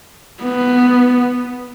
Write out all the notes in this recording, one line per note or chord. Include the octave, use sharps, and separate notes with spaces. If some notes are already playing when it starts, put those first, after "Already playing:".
B3